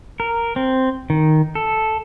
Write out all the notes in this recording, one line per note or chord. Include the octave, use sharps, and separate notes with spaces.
A#4
C4
D#3
A4